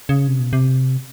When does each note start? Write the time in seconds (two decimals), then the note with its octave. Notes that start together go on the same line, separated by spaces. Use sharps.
0.09 C#3
0.28 C3
0.40 B2
0.53 C3